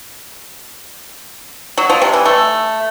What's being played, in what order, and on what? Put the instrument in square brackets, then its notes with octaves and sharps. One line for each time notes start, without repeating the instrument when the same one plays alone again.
[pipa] F#3
F3
C3
E3
A3